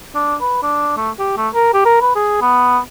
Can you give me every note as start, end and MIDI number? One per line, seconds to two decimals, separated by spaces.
0.15 0.36 62
0.41 0.59 71
0.63 0.93 62
0.97 1.10 57
1.19 1.33 67
1.37 1.49 57
1.54 1.69 70
1.74 1.81 67
1.85 1.98 70
2.01 2.13 71
2.16 2.38 68
2.41 2.79 59